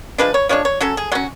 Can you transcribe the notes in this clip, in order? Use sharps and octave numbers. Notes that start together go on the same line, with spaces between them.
F3 G#3 D4 B4
C#5
F3 G#3 D4 C#5
C#5
F#3 C#4 A4
G#4
F#3 C#4 F#4